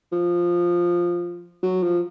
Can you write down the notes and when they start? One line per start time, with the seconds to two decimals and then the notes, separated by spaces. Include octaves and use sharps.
0.12 F3
1.63 F#3
1.83 F3